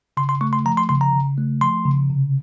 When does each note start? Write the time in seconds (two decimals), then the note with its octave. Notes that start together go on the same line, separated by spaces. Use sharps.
0.17 C#3 C6
0.29 C6
0.41 A3 C#6
0.53 C6
0.65 F3 A#5
0.77 C6
0.89 C#3 C6
1.01 A#5
1.13 C#3
1.38 A3
1.61 F3 C6
1.85 C#3
2.10 C3